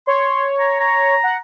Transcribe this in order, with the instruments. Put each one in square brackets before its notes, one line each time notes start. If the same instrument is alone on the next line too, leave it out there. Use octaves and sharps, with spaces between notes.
[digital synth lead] C#5 [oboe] C6
[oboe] A#5
A#5
[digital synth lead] F#5